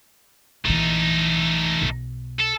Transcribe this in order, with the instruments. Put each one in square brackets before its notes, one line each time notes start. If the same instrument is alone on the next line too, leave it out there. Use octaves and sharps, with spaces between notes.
[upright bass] A#1 E3 [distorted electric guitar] A3 D#4
[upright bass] B1
[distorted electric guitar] A4